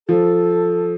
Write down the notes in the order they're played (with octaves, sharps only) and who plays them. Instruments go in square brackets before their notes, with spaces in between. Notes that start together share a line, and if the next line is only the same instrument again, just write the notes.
[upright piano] F3 [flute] A4